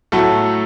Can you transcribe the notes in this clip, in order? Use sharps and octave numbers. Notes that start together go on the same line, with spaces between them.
A2 F#3 A3 A4